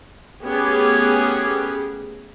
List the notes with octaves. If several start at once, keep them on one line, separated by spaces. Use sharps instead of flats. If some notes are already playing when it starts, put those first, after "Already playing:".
A3 B3 C#4 G4 G#4